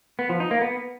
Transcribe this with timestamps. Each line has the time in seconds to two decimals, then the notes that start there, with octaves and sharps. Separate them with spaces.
0.19 B3
0.29 F3
0.40 D#4
0.51 A#3
0.62 B3